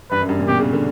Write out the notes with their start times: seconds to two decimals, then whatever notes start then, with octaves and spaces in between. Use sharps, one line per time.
0.11 G2 B4
0.20 F#2
0.29 G2
0.39 A#2
0.48 B2 G4
0.59 C#3
0.73 D3